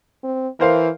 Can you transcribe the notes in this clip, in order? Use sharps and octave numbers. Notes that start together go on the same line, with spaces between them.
C4
E3 A#4 C5 F5